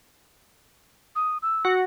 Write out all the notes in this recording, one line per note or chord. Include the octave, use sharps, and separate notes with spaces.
D#6
E6
F#4